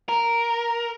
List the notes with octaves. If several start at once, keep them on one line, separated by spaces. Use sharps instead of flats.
A#4